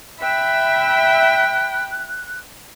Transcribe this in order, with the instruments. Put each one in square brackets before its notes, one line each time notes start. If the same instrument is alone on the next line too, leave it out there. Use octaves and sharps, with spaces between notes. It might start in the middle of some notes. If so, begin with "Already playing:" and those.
[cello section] E5 [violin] G5 B5 [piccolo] F#6